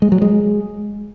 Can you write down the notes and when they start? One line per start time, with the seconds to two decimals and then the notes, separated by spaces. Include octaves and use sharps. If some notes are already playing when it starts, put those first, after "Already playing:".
0.02 G#3
0.12 F#3
0.22 G#3